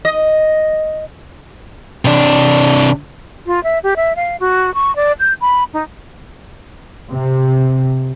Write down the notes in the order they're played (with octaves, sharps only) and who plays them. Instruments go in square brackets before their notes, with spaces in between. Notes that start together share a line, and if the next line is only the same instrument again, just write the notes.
[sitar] D#5
[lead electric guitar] C3 D4
[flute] F4
E5
G4
E5
F5
F#4
C#6
D5
G6
B5
D#4
[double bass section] C3